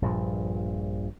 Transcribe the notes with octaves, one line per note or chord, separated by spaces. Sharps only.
A#1 G2 A#2 F3